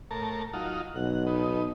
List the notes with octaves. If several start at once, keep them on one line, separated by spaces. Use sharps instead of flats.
A2 A#4 A5
F#3 D#4 F4
B1 F#5
B2 D#4